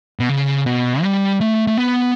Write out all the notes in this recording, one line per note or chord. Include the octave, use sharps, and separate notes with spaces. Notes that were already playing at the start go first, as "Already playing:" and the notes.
B2
C#3
B2
G3
A3
A3
B3